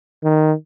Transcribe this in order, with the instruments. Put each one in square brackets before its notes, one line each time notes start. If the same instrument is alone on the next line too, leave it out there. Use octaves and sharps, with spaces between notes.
[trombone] D#3